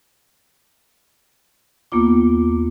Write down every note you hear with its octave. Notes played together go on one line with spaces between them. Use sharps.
D#2 A#3 B3 F4 D6